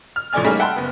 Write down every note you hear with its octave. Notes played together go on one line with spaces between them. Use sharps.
F6
A1 F3 A3 D5 G#5 F6
G3 A3 A#3 C#4 D#4 G#4
E5 F#5 G5 A5 B5 C6
F#1 B3